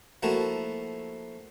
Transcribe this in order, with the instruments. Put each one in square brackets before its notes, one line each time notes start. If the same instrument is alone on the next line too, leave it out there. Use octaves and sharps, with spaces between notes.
[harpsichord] F3 A3 A#3 E4 F#4